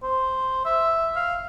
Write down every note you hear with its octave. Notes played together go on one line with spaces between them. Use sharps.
C5
E5
F5